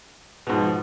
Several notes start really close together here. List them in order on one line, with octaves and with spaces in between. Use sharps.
B2 G#2 F3